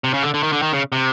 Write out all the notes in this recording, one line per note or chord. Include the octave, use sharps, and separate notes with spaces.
C3
C#3
D3
D3
D#3
D3
D#3
C#3
C3